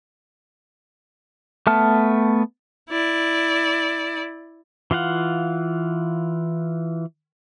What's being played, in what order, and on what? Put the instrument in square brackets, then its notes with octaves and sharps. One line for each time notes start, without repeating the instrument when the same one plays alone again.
[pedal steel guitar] A3 B3 A5 F6
[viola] E4 D5
[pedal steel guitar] E3 F4 F5 F#5